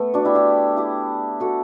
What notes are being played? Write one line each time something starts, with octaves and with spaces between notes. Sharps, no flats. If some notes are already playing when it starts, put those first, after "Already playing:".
Already playing: A3 B3
D4 F#4
E4 G4
E4 G4
E4 G4
F#4 A4